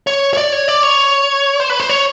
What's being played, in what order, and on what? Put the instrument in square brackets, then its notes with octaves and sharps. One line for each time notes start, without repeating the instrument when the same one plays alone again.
[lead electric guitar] C#5
C#5
D5
C#5
D5
C#5
C5
B4
C5
C#5